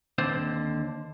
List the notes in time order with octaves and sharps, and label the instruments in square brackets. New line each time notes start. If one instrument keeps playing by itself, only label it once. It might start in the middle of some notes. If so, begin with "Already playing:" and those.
[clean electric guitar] D#2 D3 C4 C5 D5